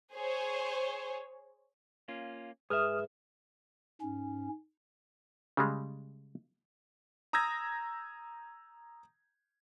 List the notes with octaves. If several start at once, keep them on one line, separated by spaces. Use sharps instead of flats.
G#4 C5 C#5
A#3 C#4 F4
G#2 G#4 B4 E5 D#6 F6
G#2 C#4
C#3 G3 G#3
A#5 D#6 E6 G6 G#6 A#6